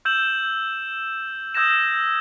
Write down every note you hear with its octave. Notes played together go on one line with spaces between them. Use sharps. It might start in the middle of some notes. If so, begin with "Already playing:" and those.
E6 G6 E7 F#7
D#6 E6 G6 G#6 A#6 E7